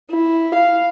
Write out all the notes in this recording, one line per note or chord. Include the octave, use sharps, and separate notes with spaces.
E4
F5